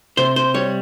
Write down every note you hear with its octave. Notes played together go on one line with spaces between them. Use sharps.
C3 C5
C5
G3 C#5